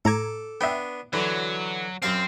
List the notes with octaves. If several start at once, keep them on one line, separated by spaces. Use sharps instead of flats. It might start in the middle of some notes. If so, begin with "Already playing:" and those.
A2 A4 A#5 D6 G#6
B3 D4 E5 G5
D3 E3 F#3
F#2 C4 F5 A5